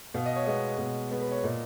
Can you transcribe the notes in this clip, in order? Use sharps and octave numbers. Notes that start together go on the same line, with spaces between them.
B2 F5
D#5
C#5
G#3 B3 D#5
B2
G#3 B3
B4
C#5
A#2 D#5